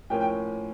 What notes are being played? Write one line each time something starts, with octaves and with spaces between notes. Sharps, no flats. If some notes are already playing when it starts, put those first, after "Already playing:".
A2 F3 A#3 C#4 G5
G5